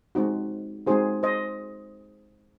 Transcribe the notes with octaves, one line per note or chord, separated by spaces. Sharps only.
G#3 C4 D#4 F#4
G#3 C4 D#4 F#4 G#4 C5
C5 D#5